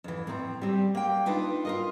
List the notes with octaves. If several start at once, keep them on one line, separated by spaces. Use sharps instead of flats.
F2 E3
A2 C4 A#5
G3 C4 G4
A#3 G5
D4 D#4 F4 B4
F4 A#4 D#5